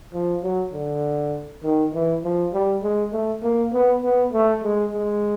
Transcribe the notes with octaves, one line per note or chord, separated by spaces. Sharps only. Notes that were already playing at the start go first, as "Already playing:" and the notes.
F3
F#3
D3
D#3
E3
F3
G3
G#3
A3
A#3
B3
B3
A3
G#3
G#3